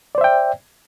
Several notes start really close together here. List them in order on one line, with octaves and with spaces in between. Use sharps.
D5 C5 E5 G5